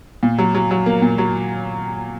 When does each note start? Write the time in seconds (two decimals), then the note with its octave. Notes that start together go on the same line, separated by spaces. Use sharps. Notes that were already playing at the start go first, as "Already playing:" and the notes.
0.23 A#2
0.38 F#3
0.54 F#3
0.71 F#3
0.86 A#3
1.02 A#2
1.18 F#3